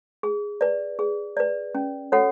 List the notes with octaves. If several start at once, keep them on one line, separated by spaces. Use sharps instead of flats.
G#4
B4 D5
G#4
B4 D5
C#4
F#4 A4 C#5 F#5